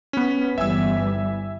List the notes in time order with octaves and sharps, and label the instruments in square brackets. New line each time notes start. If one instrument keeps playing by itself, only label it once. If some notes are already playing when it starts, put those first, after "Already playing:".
[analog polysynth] B3 B6 [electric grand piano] C#4
[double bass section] G1 E3 G3 [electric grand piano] E5 G#5 E6